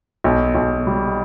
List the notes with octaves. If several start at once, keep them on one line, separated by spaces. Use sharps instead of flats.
B1
B1
G3